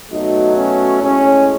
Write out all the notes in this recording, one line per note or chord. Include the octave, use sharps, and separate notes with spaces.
B2 F#3 A3 D#4
C#4
A2 G#3 C#4